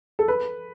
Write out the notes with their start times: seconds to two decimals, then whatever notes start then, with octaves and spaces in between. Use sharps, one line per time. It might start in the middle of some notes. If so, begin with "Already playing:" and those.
0.19 A4
0.28 B4